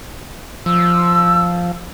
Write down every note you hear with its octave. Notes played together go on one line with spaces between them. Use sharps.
F3 E6